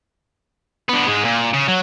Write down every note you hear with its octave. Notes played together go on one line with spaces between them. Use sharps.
D3 B3
G#2 G#3
A#2
C#3
F#3